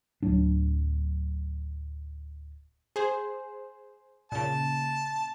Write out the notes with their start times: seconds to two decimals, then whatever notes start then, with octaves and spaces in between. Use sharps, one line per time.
0.23 D1 F#3 D4
2.96 G#4 C5
4.32 A#2 C#3 A5